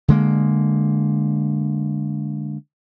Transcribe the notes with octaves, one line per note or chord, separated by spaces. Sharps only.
D3 G#3 A#3